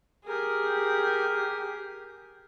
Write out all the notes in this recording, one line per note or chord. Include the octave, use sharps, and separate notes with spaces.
G4 G#4 A#4